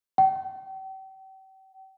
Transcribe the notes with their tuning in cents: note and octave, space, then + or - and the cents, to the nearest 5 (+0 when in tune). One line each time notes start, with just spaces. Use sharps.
G5 -40